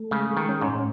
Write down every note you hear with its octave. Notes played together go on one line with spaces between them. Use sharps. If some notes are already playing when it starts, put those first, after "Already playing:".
Already playing: A3
C#3 G#3
G#3
D#3
C#4
G#2
A2